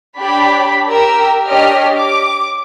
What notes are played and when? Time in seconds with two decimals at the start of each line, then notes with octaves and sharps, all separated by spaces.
0.18 D4 G4 C#5 D5 B5
0.89 G4 A#4 G5 E6
1.46 D4 G4 C#5 D#5 F6
1.95 D6